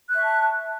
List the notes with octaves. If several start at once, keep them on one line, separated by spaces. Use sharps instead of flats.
E5 A5 C#6 F#6